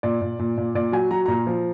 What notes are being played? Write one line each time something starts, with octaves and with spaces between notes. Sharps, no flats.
A#2 D5
A#2
A#2
A#2
A#2 D5
F#3 G#5
F#3 A#5
A#2 A#5
F3